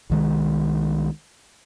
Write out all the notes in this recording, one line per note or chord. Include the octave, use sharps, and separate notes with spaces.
C2 D#3 G#3